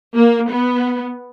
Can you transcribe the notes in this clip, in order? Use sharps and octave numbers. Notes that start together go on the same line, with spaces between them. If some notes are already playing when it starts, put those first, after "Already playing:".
A#3
B3